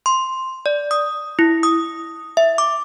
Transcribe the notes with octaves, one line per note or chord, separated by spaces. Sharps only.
C6
D5
D#6
E4
D#6
E5
D6